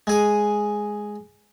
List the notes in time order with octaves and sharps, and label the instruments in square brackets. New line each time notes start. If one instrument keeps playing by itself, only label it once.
[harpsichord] G#3 G#4 D#6